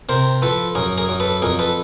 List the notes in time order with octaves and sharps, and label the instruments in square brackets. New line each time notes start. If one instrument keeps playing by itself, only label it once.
[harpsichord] C3 A#4 C5
F3 A4 B4
F#2 G#4 A#4
G#4 A#4
F#2
A4 B4
F2 G#4 A#4
A4 B4